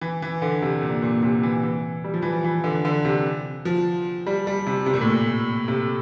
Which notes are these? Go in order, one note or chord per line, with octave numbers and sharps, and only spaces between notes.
E3
E3
D3
C3
A#2
A#2
C3
E3
E3
G3
F3
E3
F3
E3
D3
D3
C3
F3
G3
G3
C3
C3
A#2
A2
A#2
A#2
C3